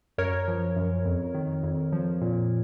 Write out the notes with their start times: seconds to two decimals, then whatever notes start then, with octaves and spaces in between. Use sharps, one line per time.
0.18 F#2 A#4 C#5
0.48 F3
0.76 F#2
1.05 F2
1.34 D#3
1.63 F2
1.93 F3
2.21 A#2